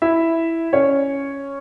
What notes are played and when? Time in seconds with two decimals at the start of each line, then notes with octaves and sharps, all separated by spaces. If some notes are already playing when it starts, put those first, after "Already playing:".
0.02 E4 E5
0.73 C#4 C#5